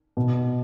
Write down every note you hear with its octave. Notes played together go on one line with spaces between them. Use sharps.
B2